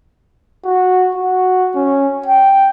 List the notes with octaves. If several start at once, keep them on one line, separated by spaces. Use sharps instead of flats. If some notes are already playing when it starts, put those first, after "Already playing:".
F#4
F#4
C#4
G5